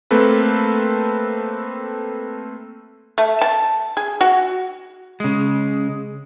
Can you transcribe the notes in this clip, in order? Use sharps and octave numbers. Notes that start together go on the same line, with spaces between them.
A3 A#3 C4 A4 B4
A3
A5
G#4
F#4
C#3 G#3